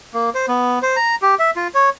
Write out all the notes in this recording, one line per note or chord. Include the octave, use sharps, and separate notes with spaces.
A#3
C5
B3
C5
A#5
G4
E5
F4
C#5